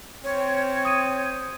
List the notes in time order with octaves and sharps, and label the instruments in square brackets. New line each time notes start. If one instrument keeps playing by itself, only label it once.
[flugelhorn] C4 [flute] C#5
[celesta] D#6 G#6 D#7